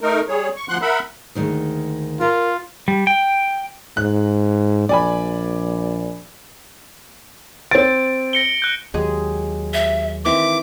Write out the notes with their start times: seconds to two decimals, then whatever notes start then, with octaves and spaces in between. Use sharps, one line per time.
0.01 A3 D#4 A#4
0.29 G3 G#4 C#5
0.57 C#6
0.69 D2 F3 F#5 C6 F#6
0.82 A#4 E5 F#5 B5
1.35 D2 D#3 G#3
2.21 F4 A#4
2.88 G3
3.07 G5
3.97 G#2 F#6
4.89 A#1 D5 G#5 B5
7.71 C4 A6 D7
8.33 A#6 C#7 G7
8.62 F#6 G6
8.94 D#2 F#3 G#3 G4 G#4
9.74 E5
10.25 D#3 E3 C4 E5 D6